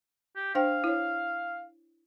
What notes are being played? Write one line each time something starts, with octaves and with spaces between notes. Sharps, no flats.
G4
D4 C5 F5 G5
E4 C#5